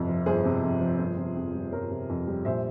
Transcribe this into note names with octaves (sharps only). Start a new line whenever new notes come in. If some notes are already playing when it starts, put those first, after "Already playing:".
Already playing: G1 F2 C3
F3
G1 G#4 C5
C3
F2
F3
G1
C3
F2
G3
G1 A#4 C#5
C3
F2
G3
A#1 C5 E5